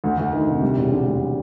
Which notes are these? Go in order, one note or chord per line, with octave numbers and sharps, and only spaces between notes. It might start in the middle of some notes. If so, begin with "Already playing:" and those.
D2
D2
D#3
C3
G3
E1
D3
D2